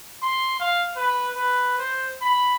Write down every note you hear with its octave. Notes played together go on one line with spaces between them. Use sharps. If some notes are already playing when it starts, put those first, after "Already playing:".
C6
F5
B4
B4
C5
B5